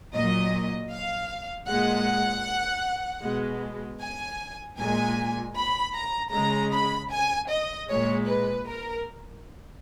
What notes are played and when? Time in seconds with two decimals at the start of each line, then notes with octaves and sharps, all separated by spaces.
0.14 A#2 F#3 D#5
0.91 F5
1.68 A#2 G#3 F#5
3.23 B2 G#3
4.01 G#5
4.79 A#2 G#3 G#5
5.56 B5
5.95 A#5
6.33 C#3 G#3 A#5
6.72 B5
7.11 G#5
7.49 D#5
7.89 A#2 G#3 C#5
8.27 B4
8.66 A#4